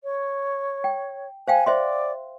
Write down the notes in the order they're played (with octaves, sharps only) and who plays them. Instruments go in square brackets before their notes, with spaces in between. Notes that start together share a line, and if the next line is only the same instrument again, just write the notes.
[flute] C#5
[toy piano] G5
[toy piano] C5 F5 G5 [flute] G#5
[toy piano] C5 E5 C6 [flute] D5